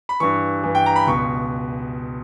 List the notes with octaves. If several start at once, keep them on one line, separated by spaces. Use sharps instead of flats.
B5
G2 E3 C#6
G2 E3
G5
A#5
B5
C#2 B2 C#6